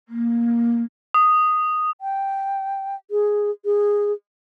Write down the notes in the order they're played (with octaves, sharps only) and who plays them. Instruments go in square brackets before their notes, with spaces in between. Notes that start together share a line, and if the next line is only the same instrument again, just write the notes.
[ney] A#3
[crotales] D#6
[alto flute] G5
G#4
G#4